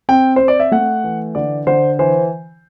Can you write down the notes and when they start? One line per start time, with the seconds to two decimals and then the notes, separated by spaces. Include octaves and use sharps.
0.09 C4 G5
0.36 C4 C5
0.48 D5
0.60 E5
0.72 A3 F#5
1.04 E3
1.35 D3 D5
1.67 D3 C5
1.99 E3 C5